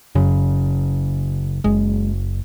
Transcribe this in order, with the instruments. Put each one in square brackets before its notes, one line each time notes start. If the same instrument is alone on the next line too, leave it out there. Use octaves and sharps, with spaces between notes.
[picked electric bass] F#1 C#3 [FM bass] F#2
[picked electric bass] F#1 [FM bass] G#3